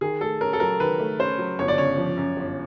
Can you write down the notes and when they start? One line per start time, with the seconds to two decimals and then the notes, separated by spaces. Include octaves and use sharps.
0.01 D#3 G#4
0.21 A3 A4
0.41 C#4 A#4
0.53 A4
0.60 F#3 A#4
0.80 D#3 B4
1.00 A3
1.19 C#4 C5
1.39 F#3
1.59 G1 C#5
1.68 D5
1.78 C#3 C#5
1.97 F3
2.17 F#2
2.37 G1